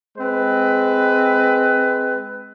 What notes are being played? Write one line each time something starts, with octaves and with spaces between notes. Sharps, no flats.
G#3 C4 B4